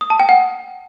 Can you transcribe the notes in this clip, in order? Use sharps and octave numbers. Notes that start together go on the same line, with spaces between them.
D#6
A5
G5
F#5